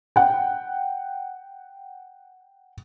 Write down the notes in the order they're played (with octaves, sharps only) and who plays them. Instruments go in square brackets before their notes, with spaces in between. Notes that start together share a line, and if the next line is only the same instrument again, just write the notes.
[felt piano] F#5 G5